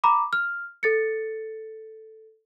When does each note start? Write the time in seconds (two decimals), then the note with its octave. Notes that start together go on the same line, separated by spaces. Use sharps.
0.04 A#5 B5 D6
0.33 F6
0.83 A4 A6 C#7